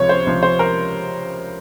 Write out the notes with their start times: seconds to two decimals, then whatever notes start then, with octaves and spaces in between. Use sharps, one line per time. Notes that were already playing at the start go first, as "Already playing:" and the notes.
Already playing: C#2 C3 F3 C#5
0.09 C5
0.26 C#2 C3 F3
0.43 C5
0.59 A#4